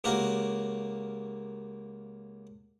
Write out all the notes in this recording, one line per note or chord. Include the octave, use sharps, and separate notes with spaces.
C#2 A#3 F#4 G4 A#4